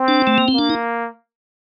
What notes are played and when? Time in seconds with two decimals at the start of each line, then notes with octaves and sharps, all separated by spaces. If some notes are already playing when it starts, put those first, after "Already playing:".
Already playing: C4
0.08 D4
0.27 A3
0.38 A#3
0.48 C4
0.54 A#3 D4
0.70 D#4